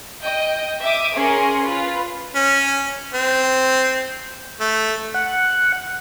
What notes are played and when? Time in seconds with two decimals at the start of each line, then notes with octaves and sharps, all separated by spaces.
0.20 D#5 G5
0.84 E5 D6 D#6
1.16 C#4 G#4 A#4 C6
1.65 F4 B4
2.35 C#4
3.14 C4
4.60 A3
5.14 F#5